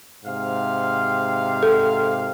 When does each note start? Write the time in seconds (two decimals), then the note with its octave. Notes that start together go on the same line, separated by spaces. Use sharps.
0.24 G#2 C3 F5
1.63 A4